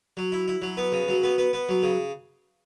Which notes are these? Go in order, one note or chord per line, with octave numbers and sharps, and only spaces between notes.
F#3
E4
E4
F#3
B3
C#3
F#3
B3
B3
B3
F#3
C#3